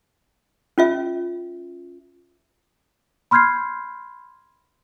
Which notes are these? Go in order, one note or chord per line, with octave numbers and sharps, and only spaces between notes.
C#4 F4 E5
B5 C6 F6 G6 G#6 C7